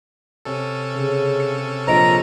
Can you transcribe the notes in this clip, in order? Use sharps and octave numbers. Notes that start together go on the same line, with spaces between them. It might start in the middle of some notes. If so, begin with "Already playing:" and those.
C3 C#4 A4
C#3
C#7
A#1 C5 D#5 A#5 D7